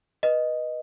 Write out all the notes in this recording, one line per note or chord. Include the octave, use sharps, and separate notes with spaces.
B4 D#5